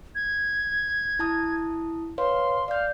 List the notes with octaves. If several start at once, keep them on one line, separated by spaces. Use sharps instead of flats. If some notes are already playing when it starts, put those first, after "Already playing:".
G#6
E4 A5 D#6
B4 C#5 F5 C6
D5 F5 G6